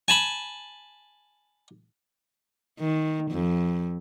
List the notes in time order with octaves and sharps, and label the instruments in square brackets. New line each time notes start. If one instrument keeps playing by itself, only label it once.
[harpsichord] G#5 A5 B5
[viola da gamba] D#3
F2